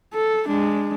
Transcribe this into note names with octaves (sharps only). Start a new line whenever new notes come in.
A4
G#3 D4